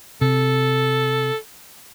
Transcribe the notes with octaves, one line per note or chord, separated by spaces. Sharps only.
C3 A4